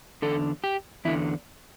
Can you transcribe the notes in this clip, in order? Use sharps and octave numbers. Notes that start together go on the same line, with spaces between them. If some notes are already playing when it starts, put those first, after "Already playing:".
E2 D3 A4
G4
E2 D3 E4